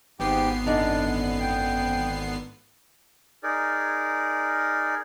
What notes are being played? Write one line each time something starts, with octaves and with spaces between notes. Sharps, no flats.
G#1 G#2 B3 G4 G5 C7
F#2 D3 D4 D#4 D5
G5
D#4 G#4 A#4 D5